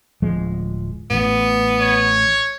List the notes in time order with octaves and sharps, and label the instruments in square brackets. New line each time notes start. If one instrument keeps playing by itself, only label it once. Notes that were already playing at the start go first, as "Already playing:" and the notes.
[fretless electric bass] D1 F3 G#3
[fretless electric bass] A1 A2 [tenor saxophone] B3
[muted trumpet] C#5